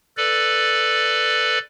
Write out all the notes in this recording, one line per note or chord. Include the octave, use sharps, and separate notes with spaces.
A4 B4 D5